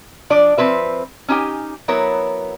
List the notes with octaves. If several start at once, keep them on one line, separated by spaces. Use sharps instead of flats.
F3 D4 D5
F3 A3 C4 B4 E5
C#4 D#4 G4 G#5
F#3 B3 E4 A#4 C#5